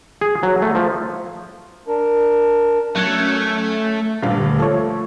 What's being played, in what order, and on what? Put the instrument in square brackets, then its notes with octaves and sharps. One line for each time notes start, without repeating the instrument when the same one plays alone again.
[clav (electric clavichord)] G#4
F#3
A3
F3
[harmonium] D4 A#4
[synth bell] F#3 C#4 [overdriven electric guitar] A3
[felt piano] D#1 G2 F5
[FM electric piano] D2
[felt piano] F3 A3 [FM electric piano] A4 C#5